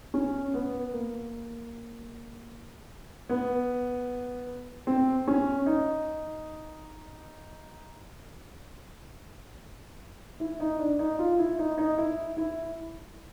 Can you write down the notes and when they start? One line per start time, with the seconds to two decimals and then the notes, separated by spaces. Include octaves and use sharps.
0.14 C#4
0.54 B3
0.93 A#3
3.29 B3
4.87 C4
5.27 C#4
5.66 D#4
10.40 E4
10.60 D#4
10.79 D4
10.99 D#4
11.19 F4
11.39 E4
11.59 D#4
11.78 D#4
11.97 E4
12.37 E4